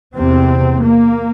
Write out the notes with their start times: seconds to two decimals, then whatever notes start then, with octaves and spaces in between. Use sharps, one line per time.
0.15 E2 C3 C4
0.82 A#3